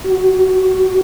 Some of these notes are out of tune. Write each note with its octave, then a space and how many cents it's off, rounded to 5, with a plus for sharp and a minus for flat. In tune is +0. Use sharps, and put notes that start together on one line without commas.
F#4 +20